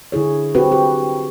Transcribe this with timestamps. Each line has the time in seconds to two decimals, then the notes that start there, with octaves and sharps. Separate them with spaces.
0.12 D3 E4 G#4 C#5
0.55 C4 F#4 G4 B4
0.72 G4